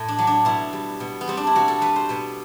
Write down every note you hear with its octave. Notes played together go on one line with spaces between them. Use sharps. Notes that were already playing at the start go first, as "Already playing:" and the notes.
Already playing: A2 E4
D4
F#3
D4
B2 E4
G3
B2
B3
G3 C4
D4
E4
B2 F#4
A4
G3 B4
C5
B2 B4